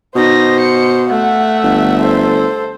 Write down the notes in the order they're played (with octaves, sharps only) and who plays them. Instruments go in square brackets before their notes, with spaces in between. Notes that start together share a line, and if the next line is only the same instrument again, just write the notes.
[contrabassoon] B2 [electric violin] D#4 A#6 [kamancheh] C5
[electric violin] C#7
[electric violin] A3 E5 [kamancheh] F#5
[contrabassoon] G1
[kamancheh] A4 C5